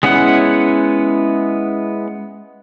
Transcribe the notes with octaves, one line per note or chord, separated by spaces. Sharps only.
G#3 B3 C#4 E4 F#5